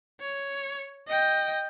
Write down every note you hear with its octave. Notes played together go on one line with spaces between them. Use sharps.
C#5
D#5 G5